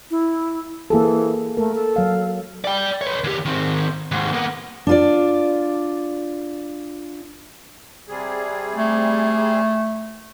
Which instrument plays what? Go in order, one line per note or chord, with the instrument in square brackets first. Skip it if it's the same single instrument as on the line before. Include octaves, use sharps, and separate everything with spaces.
[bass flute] E4
[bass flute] E3 [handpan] A#3 G#4 A4
[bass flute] A3 [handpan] A#4
[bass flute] A4
[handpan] F#3 F5
[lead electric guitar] D5 G5
B4 C#5
D#2 G4
D#3 C4
D#2 G#2
A#3 B3
[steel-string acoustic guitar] D4 F4 D5
[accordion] C3 G3 G#4
[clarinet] A3